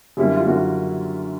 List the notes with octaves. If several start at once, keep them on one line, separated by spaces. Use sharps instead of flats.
F#2 D3 G3 A#3 E4
E4
F4
F#2 D3 G3 A#3 F#4
F4